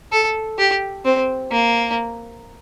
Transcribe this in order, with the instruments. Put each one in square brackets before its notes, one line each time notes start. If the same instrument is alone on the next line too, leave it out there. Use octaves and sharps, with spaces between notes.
[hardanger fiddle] A4
G4
C4
A#3